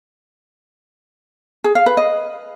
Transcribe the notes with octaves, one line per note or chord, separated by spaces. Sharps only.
G#4
F5
B4
D#5